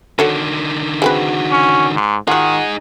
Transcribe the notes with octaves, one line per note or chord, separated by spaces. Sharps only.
D3 D#3 F#4 A4 C#5
G#3 C4 F#4 B4
C#4
G#2
D#3 D#4 F4 F#4 G#4 F#5